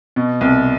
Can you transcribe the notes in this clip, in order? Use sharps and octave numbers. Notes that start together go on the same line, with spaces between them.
B2
C2